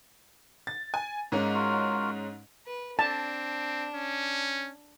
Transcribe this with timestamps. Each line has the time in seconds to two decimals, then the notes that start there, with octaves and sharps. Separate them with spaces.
0.67 A6
0.94 G#5
1.32 G#2 G#3 A#3 C#4
1.55 F4 F#4 A#4
2.66 B4
2.99 C4 D4 A5
3.94 C#4